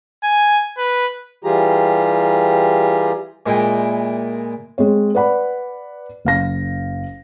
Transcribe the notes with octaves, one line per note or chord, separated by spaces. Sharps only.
G#5
B4
E3 G3 F4 G4 G#4 A#5
A#2 G#3 E4 G5
G#3 C4 C#5
B4 D5 F#5 B5
F#1 F5 A#6